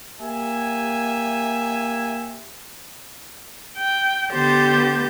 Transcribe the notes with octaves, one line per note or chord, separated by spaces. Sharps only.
A#3 G4 E5 G#5
G5
D3 B3 G4 C5 G6 A6